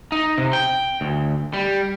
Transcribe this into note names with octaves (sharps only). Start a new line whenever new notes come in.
D#4
C3
G5
D2
G3